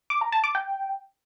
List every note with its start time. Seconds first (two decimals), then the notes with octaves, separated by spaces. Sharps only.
0.10 D6
0.21 A#5
0.32 A5
0.44 D6
0.55 G5